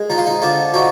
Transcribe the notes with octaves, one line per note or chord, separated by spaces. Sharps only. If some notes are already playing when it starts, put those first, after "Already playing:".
Already playing: G#3
F3 D#4
F4
D#4
D3 D4 F4
F3 D#4 F#4